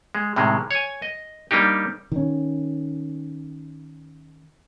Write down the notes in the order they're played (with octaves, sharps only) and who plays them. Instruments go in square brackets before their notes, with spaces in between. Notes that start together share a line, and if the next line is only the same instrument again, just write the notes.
[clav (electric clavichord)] G#3
A2 C3 D#3 G#3
C#5 G#5
D#5
G3 A#3 D4 D#4 G4
[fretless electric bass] D#3 C#4